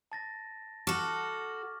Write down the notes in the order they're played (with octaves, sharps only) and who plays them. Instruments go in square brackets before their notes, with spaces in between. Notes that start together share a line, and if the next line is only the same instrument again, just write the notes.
[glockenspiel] A5 A6 A#6
[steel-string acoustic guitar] F#4 A4 [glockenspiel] C#6 D6 F6